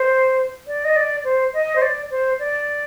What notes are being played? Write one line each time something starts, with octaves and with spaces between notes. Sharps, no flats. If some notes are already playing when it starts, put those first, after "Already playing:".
Already playing: C5
D5
D#5
D5
C5
D#5
C5
D5
C5
D5